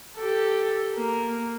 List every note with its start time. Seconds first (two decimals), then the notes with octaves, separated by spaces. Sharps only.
0.16 G4 A4
0.95 A#3